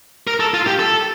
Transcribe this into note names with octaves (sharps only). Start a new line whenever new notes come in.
A#4
A4
F4
G4
A4